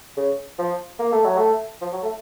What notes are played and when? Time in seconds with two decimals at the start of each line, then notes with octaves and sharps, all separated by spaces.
0.17 C#3
0.59 F3
0.99 A#3
1.12 A3
1.25 F#3
1.38 A3
1.82 F3
1.92 F#3
2.02 A3